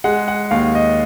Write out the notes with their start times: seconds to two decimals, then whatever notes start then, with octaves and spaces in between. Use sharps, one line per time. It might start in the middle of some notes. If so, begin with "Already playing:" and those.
0.04 G#3 F#5
0.28 F#5
0.51 D#2 F5
0.75 D#5